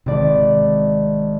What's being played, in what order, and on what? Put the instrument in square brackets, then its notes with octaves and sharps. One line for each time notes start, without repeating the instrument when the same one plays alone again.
[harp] G#1 D5 [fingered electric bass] C3